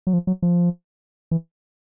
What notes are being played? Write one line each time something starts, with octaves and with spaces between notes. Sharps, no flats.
F#3
F3
F#3
F3
E3